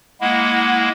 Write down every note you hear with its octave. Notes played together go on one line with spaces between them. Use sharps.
G#3 A#3 E4 F#5